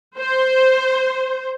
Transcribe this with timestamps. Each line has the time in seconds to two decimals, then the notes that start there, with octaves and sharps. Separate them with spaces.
0.17 C5